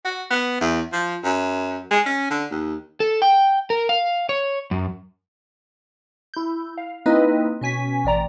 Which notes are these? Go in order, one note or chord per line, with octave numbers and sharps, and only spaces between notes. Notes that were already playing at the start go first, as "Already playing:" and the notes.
F#4
B3
E2
F3
F#2
G#3
C#4
D3
D#2
A4
G5
A#4
F5
C#5
F#2
E4 G6
F5
A#3 C4 D#4 E4 B4 D#5
B2 C#4 G#5 B6
A1 C4 D5 A#5